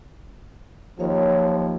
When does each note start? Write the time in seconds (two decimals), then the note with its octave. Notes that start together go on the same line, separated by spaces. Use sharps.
0.99 D#2 F3 F#3 C#5 A#5